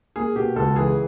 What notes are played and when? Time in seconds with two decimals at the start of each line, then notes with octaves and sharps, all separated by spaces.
0.16 A#3 G#4
0.35 B2 G4
0.56 C#2 A4
0.76 E3 G#4